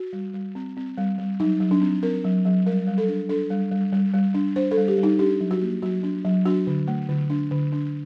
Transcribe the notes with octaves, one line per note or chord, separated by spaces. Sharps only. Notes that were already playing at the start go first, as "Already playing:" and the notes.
Already playing: F#4
G3
G3
C4
C4
G3
G3
F#3 D#4
F#3
D4
C4
C4 A#4
F#3
F#3
G3 A#4
G3
A4
D4
D4 A4
G3
G3
G3
G3
D4
D4 C5
A4
G3
G4
G3
D#4
D4 G4
F#3
F#4
A#3
F#3 F#4
D4
F#3
D4 F#4
D3
A3
D3
D4
D3
D4